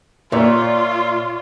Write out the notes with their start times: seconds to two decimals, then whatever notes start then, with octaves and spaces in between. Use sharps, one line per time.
0.32 A#2 F4 C#5 D5 E5